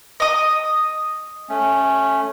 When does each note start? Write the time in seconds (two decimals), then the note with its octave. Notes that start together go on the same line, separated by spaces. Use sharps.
0.20 D#5 D#6
1.49 A3 C#4